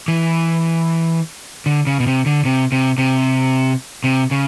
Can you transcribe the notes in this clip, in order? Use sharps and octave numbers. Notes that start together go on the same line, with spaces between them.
E3
D3
C#3
B2
C3
D3
C3
C3
C3
C3
C#3